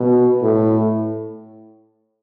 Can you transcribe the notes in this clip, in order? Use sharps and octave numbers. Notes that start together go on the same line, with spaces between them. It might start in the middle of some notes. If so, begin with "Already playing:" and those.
Already playing: B2
A2